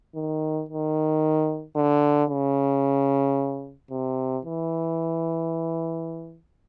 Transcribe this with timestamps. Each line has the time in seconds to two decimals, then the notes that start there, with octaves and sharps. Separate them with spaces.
0.15 D#3
0.69 D#3
1.76 D3
2.30 C#3
3.90 C3
4.45 E3